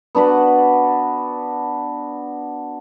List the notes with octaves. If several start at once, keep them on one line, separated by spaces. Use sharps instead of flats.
B3 D4 F#4 B4